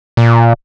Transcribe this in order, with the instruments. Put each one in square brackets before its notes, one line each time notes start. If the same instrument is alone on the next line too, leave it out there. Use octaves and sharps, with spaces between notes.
[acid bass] A#2